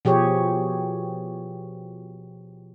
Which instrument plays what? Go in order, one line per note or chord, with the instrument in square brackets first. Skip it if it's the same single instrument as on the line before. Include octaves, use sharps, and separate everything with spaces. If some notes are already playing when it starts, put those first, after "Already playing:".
[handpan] B2 F3 G4 G#4 C#5